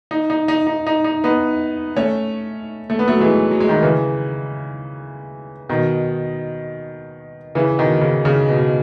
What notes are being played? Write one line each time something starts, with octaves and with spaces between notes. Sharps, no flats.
D#4
D#4
D#4
D#4
D#4
D#4
B3 D#4
A3 C#4
A3
B3
F#3 A3
E3 G#3
F#3
G#3
D#3 F#3
C#3 E3
B2 D#3
C#3 E3
B2 D#3
C#3
C#3
B2